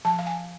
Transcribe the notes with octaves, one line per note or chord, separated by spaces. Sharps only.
F3 A5
F5
G#5